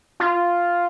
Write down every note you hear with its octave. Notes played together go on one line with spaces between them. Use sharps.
F4